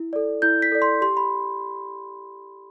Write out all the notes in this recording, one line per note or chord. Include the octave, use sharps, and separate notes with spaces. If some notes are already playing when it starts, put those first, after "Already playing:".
Already playing: E4
A4 D5
E4 G6
B6
A4 D5
C6
G4 C6
B5